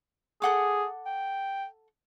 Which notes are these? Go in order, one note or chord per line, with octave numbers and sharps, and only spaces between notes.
G#4 A4 F#5 D6
G5